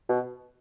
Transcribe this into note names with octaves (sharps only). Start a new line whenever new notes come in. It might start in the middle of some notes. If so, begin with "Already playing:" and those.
B2